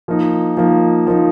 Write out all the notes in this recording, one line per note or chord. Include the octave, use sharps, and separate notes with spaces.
F3 A#3 D#4
F3 A#3 D#4
F3 A#3 D#4